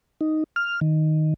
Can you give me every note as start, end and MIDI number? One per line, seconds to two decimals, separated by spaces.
0.21 0.44 63
0.56 0.80 89
0.81 1.34 51